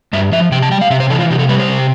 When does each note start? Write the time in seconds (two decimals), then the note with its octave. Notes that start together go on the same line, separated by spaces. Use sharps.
0.13 G2 E5
0.32 F3 E5
0.52 C3 G5
0.62 A5
0.71 G3 G5
0.81 F5
0.90 C3 E5
1.00 C5
1.10 E3 A4
1.20 F4
1.30 C3 G4
1.39 A4
1.49 G3 B4
1.59 C5
1.68 C3